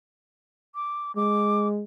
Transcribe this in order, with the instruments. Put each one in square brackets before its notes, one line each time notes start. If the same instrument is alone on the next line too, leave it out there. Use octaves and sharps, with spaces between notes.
[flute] D6
[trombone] G#3 [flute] D6